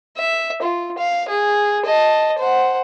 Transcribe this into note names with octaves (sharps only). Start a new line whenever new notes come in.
E5
F4
F5
G#4
D#5 A5
C5 F#5